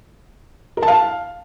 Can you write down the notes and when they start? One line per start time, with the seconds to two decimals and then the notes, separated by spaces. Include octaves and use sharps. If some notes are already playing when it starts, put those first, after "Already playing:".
0.77 A#4
0.83 A5
0.88 F5